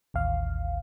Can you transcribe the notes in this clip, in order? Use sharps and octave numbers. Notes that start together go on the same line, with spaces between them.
A1 D#2 F5